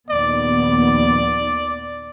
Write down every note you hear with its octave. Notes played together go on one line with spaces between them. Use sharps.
A#1 D#2 B3 D5